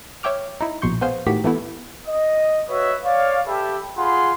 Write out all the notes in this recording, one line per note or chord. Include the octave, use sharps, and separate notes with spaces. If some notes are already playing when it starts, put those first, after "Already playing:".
C#5 E5 G5 D6 F6
D#4 E4
A#1 B2 C6 C#6 G6
B3 G#4 C5 F5
A2 D#3 F#4 G4 B6
E3 A3 B3 E4
D#5
F#4 B4 C#5 D#5 E5
C#5 D5 F5
G4 A4 B4 E5
F4 G#4 F#5 B5 C6